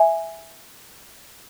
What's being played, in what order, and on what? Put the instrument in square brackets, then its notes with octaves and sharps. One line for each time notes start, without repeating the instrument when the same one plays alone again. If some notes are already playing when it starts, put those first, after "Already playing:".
Already playing: [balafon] E5 G#5